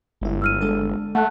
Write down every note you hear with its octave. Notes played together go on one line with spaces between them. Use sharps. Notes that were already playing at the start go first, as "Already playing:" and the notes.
G1 G#3 E4
E6 F6 D#7
G#3 D4 A4
A3 F#5 A5 F#6